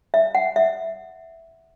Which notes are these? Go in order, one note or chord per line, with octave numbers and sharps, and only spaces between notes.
E5
F#5
E5